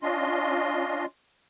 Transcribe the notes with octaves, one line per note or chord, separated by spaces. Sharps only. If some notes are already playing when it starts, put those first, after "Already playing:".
C#4 D4 F4 D#5 C6